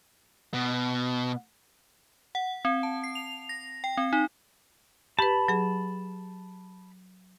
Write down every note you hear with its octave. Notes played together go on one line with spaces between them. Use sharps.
B2
F#5
C4
A5
C7
F7
A#6
G5
C4
D#4
G4 B4 A5 B5
F#3 G#4